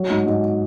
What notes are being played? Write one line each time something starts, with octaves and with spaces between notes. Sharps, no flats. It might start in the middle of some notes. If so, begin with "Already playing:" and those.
Already playing: F#3
G#2
G#2